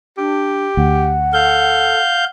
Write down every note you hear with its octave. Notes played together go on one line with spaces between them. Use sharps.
D4 G4
D2 F#5
A4 F5 G6